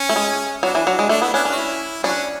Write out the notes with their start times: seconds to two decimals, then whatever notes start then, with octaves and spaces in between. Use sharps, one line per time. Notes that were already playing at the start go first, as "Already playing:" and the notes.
Already playing: C#4
0.09 A3
0.16 G#3
0.63 F#3 B3 D4
0.75 E3
0.87 F#3
0.99 G#3
1.09 A3 D4
1.22 B3 E4
1.34 B3 C#4 D4
1.45 C#4
1.52 F#4
1.57 E4
2.03 F#3 C#4 D4